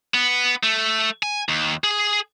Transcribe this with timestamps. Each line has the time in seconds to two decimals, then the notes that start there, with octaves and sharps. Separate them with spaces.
0.14 B3
0.63 A3
1.23 G#5
1.49 D#2
1.84 G#4